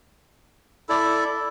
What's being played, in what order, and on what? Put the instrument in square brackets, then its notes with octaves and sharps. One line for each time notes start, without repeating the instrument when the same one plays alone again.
[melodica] E4 A4 D5